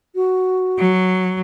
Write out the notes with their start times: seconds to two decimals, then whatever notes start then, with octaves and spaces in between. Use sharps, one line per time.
0.15 F#4
0.78 F#3